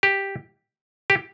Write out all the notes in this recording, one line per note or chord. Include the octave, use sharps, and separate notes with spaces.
G4
G4